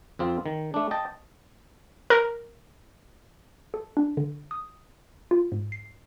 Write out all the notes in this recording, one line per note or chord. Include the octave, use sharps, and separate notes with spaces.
F2 C4 F4
D#3
A3 D4
D#5 G5 A5
A#4
A4
D4
D3
D#6
F4
G#2
C7